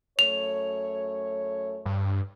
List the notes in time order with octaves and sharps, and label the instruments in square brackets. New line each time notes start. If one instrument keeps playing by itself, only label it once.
[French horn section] F#2 A3 C#5 [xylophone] F7
[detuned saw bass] G2